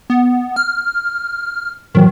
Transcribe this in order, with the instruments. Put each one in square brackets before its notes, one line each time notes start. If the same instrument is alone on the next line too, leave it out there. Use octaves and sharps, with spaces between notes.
[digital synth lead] B3
F6
[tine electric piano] A2 E3 F#3 [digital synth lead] D#3